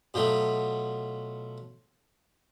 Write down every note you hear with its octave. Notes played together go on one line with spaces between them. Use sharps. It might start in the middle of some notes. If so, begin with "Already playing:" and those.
B2 F3 F#3 A3